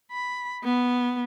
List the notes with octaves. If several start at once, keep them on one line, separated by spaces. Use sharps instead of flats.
B5
B3